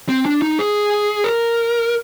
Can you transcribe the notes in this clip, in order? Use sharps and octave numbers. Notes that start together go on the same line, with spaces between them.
C4
D4
D#4
G#4
A#4